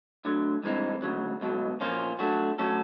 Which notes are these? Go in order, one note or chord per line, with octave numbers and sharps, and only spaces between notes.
D2 D3 F#3
G2 E3 G#3 C4 D#4
D2 C#3 F#3
C#2 B2 F#3
A#2 F3 A#3 C#4 F4
F#3 A3 D4 F#4
F#3 A3 C#4 F#4 A4